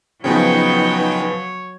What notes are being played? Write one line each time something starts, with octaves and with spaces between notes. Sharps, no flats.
C#3 F3 F#3 B3 D#4 B4 C#5 G5